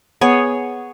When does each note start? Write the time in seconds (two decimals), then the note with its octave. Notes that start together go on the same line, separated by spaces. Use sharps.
0.21 B3 G#4 C#5